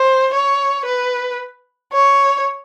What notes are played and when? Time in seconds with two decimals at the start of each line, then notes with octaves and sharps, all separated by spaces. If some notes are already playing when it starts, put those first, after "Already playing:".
Already playing: C5
0.34 C#5
0.85 B4
1.93 C#5